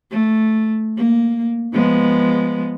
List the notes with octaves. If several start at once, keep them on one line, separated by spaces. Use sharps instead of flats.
A3
A#3
F3 G#3 B3